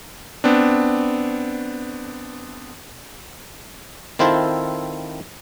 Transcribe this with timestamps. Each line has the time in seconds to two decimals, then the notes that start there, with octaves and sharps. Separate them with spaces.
0.44 B3 C4 D4
4.19 D#3 C4 E4 F4 A4 C5